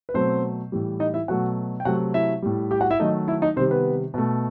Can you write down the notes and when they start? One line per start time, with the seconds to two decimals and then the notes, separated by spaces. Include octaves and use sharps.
0.09 B4
0.14 B2 F#3 A3 C4 C5
0.72 A2 E3 G3
1.00 D#4 D#5
1.14 E4 E5
1.28 B2 F#3 A3 F#4 F#5
1.80 G5
1.85 C3 F#3 A3 F#4 F#5
2.14 E4 E5
2.42 A2 G3
2.71 G4 G5
2.81 F#4 F#5
2.90 E4 E5
2.99 D#3 F#3 A3 D#4 D#5
3.28 E4 E5
3.42 D#4 D#5
3.56 C3 D#3 G3 C4 C5
3.71 B3 B4
4.14 B2 A3